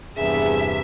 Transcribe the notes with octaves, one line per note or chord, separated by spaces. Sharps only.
E2 G2 C3 G#4 E5